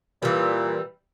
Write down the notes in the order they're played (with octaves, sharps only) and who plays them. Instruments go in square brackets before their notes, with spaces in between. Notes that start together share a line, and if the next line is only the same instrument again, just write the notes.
[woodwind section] A#2 [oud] E3 G3